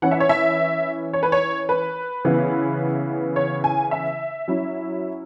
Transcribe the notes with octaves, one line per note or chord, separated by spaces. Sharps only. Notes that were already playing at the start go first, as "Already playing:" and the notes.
E3 C#4 E4 F#5
E5
C#5
E5
C#5
B4
C#5
B4
C#3 E3 B3 E4
C#5
G#5
E5
F#3 C#4 E4